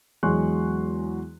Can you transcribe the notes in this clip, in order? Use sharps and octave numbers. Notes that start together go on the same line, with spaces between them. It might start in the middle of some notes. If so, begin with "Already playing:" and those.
E2 F#3 G#3 C6 C#6 F#6